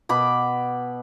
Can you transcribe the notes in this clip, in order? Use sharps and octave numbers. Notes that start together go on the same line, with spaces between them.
B2 B5 D6